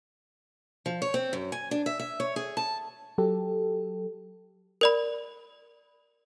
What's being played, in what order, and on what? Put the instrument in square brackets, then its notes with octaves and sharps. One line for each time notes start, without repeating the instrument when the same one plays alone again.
[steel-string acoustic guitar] F3
C#5
C4
F#2
G#5
D4
E5
E5
C#5
G#4
A5
[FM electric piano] F#3 G4 A4
[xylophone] A#4 D5 B5